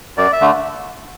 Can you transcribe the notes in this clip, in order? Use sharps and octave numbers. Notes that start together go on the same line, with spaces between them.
F#2 D5
E5
D3 A3